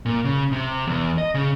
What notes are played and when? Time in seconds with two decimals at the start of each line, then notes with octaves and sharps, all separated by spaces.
0.06 A#2
0.25 C#3
0.52 C3
0.87 E2
1.18 D#5
1.34 C#3